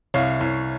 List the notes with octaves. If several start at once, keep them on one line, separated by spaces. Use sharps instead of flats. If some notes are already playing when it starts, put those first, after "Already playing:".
C2 C#5 F5
C2